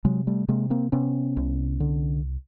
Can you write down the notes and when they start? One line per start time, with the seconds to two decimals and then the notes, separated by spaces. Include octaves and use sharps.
0.05 C3 F#3 G#3
0.27 G3 A3
0.48 C3 G#3 A#3
0.70 A#3 C4
0.92 C3 B3 C#4
1.37 C2
1.80 D3